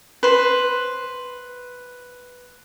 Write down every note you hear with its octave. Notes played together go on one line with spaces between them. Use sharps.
B4 C5